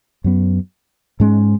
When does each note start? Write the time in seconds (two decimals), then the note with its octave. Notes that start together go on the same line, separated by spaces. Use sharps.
0.24 F#2 F#3 B3
1.20 G#2 G#3 C#4